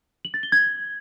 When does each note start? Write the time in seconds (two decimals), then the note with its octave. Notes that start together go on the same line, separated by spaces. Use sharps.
0.25 F#7
0.34 A6
0.43 G7
0.52 G#6